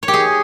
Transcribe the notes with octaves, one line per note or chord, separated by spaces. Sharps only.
C#5
G4
G#4